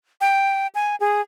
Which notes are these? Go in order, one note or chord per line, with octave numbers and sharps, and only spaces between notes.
G5
G#5
G#4